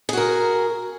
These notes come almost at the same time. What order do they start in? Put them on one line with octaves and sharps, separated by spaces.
G#4 F#4 A#4